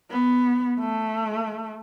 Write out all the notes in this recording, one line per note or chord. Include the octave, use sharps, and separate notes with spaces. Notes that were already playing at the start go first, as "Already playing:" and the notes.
B3
A3